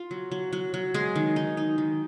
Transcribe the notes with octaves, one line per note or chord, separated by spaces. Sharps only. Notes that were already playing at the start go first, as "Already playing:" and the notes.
Already playing: F4
F#3
F#3
F#3
F#3
G#3 G#4
D#3
D#4
D#4
D#3